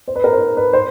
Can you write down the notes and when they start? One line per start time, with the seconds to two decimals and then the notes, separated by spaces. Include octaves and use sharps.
0.08 C5
0.16 B4
0.24 A#4
0.33 C5
0.57 B4
0.73 C5